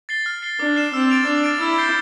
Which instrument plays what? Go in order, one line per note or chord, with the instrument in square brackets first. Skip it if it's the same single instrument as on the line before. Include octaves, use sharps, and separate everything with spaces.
[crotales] A6 C7 G7
F6
C7 G7
[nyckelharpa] D4 [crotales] D6
[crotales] F6 C7 E7
[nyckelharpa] C4 [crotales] E6
[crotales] A6 D7 F7
[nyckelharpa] D4 [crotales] D6
[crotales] F6 A6 D7
[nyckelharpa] E4 [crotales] E6
[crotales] G6 C7 G7